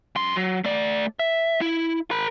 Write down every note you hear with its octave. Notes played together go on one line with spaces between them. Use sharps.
F#2 C6
F#3
A3 D5
E5
E4
A#4 B5